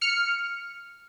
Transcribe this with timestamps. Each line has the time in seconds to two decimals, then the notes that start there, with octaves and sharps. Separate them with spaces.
0.01 F6 C#7